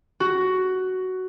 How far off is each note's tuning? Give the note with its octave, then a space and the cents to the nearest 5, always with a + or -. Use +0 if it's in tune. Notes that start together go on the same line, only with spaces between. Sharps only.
F#4 +10